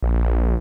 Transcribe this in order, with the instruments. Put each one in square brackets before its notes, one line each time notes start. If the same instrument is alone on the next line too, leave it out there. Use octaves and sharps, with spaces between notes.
[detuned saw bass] A#1